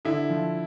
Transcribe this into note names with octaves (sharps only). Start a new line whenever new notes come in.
D3 E4
F3